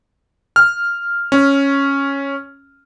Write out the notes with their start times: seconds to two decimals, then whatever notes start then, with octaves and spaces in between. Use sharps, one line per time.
0.56 F6
1.32 C#4